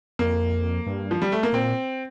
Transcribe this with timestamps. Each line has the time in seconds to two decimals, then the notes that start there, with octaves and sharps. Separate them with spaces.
0.19 F2 A#3
0.86 G2
1.11 F3
1.22 G3
1.32 A3
1.43 A#3
1.53 A#2 C4